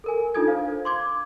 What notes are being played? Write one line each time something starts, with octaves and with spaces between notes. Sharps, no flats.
A4 A#4 G#5
D4 D#4 F4 A4 D#6 G#6
C5 F5
C6 D6 G#6